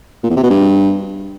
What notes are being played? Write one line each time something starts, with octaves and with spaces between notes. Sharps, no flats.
A#2
E2
C3
B2
G2